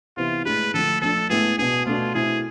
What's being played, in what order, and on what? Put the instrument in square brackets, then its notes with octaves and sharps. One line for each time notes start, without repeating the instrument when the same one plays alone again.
[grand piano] C3 E3 B3 E4 [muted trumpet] F4
[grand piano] A2 G#3 D4 [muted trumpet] B4
[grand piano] D3 F3 A3 [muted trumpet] A4
[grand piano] F3 A3 D4 [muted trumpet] A4
[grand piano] A2 G#3 B3 E4 [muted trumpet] G#4
[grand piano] B2 B3 D4 [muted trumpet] G#4
[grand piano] B2 A3 D4 [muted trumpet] F4
[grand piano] B2 A3 C4 E4 [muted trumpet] G#4